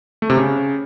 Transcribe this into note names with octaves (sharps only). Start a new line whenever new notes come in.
A3
C3
C#3